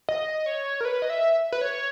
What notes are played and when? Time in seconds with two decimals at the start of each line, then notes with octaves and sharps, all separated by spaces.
0.09 D#5
0.46 C#5
0.81 A#4
0.85 B4
1.02 D#5
1.10 E5
1.52 B4
1.61 C#5